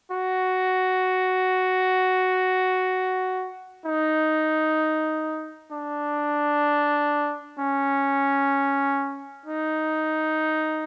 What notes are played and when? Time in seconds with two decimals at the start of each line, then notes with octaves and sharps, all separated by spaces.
0.11 F#4
3.85 D#4
5.72 D4
7.59 C#4
9.46 D#4